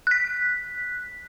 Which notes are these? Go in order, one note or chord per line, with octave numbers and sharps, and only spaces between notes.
F#6 B6